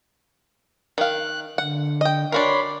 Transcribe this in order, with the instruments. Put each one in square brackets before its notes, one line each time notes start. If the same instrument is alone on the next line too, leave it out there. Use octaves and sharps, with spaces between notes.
[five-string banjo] D#3 F5 [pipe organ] F#6
[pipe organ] D3 [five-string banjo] F#5
[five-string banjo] D#5 G5
[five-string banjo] D4 F#4 A#4 [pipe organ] C#5 B5 C6